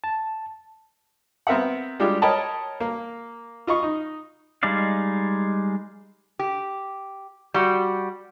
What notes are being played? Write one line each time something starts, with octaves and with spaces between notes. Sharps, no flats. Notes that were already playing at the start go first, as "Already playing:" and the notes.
A5
B3 C4 A#4 E5 F#5
G3 G#3 D4 F4 G4
A#4 C#5 D#5 G5 A5 B5
A#3
F4 D#5 B5 C#6
D#4
G3 G#3 D#4 D5 F5
G4
G3 F#4